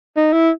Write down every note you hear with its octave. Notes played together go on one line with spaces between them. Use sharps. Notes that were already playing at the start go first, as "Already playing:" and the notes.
D#4
E4